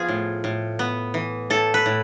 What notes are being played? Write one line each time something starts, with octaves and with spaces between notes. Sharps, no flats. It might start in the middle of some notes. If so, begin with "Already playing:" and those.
Already playing: F3 B3 F4 G#4
A2
A2
B3
E3
A2 A4
B4
A2